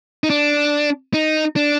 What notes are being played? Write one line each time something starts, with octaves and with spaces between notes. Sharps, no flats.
D#4
D4
D#4
D4